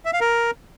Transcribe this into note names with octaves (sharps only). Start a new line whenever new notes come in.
E5
F5
A#4